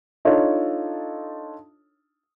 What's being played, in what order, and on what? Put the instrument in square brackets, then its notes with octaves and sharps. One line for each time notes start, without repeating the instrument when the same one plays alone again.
[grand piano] D4 D#4 F4 A4 C#5